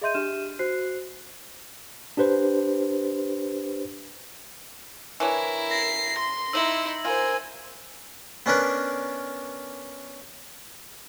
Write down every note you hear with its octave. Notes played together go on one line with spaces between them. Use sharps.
G#4 D#5 E5 C6 G6 D#7
D4 G4 F6 D#7 E7
F#4 C5 F#6 C7
D4 G4 B4 C5
E3 D4 E4 A#4 C#5
A#6 C7
C6
D#4 E4 E6 F#7
F4 A#4 C5 G#5
B3 C#4 D4 A#4 B4